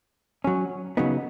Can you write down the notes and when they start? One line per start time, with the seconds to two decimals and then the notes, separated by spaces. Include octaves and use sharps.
0.44 F#3 C#4
0.97 C#3 F#3 B3 D#4